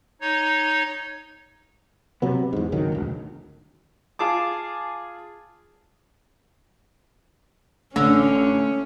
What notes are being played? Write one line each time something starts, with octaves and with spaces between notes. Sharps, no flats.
D#4 C#5
C3 F#3 B3
E2 G#2
G#1 C#2 D#3 F#3
E1 D2
F4 G#4 A5 D6
A1 D3 A3 C#4